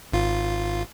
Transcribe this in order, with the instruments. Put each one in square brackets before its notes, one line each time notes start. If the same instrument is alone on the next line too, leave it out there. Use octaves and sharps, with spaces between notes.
[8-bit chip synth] G#1 F4